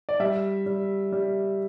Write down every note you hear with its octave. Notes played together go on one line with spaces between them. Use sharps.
D5
G3 E5
G3
G3